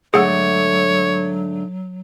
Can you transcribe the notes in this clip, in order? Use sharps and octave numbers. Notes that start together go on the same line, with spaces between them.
G#2 D3 F#3 A3 G#4 C#5 F#5 E6